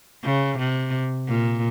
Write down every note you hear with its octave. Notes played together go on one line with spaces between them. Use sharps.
C#3
C3
A#2